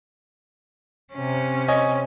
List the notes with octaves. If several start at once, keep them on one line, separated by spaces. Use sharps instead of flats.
C3 C#4
C#5 D#5 G#5